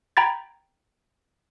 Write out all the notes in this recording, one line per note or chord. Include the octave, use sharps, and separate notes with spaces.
G5 A#5 B5 G#6 A6